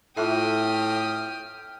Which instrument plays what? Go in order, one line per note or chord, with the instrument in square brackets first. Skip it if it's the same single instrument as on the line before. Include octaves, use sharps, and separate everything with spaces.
[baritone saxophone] A2 [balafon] F4 A4 E5 [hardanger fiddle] G5 D#6 [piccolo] F6